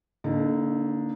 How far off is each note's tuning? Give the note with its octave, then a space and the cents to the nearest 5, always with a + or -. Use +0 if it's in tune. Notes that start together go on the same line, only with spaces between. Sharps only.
D3 -30 A#3 +0 D#4 +0